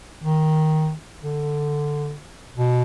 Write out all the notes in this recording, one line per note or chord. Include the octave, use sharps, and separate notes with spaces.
D#3
D3
B2